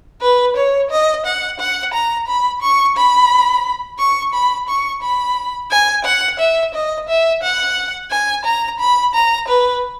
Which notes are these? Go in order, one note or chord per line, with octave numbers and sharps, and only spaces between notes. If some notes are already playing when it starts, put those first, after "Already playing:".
B4
C#5
D#5
F#5
F#5
A#5
B5
C#6
B5
C#6
B5
C#6
B5
G#5
F#5
E5
D#5
E5
F#5
G#5
A#5
B5
A#5
B4